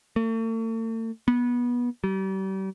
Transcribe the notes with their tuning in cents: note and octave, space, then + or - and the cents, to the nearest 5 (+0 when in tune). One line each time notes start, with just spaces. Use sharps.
A3 +45
B3 -25
G3 -35